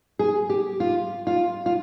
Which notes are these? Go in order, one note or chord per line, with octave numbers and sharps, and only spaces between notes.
G#4
G4
F4
F4
F4